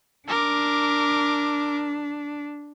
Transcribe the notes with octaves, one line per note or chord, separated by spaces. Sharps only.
D4 A#4 D6